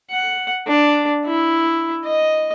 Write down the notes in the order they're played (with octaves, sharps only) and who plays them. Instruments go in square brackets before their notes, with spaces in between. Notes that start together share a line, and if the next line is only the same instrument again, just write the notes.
[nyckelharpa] F#5
D4
E4
D#5